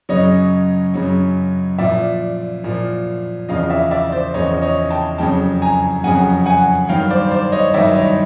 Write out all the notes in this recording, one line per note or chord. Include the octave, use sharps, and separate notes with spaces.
F#2 C#3 F#3 C#5 D#5
F#2 C#3 F#3
A#2 F3 D5 E5
A#2 F3
E2 C#3 F3 D#5 F5
D5 E5
D5 E5
C5 D5
E2 C#3 F3 C#5 D#5
C#5 D#5
G5 A5
F2 C#3 F#3 G5 A5
G#5 A#5
F2 C#3 F#3 F#5 G#5
F#5 G#5
G2 D#3 F#3 F5 G5
C5 D5
C5 D5
C#5 D#5
G2 D#3 F#3 D5 E5
C#5 D#5